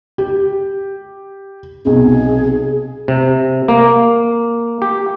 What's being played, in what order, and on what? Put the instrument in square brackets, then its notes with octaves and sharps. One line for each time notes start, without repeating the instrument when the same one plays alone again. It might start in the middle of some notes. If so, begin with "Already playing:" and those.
[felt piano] G4
[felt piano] B1 C3 [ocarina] G#4
[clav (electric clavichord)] C3
A#3
G4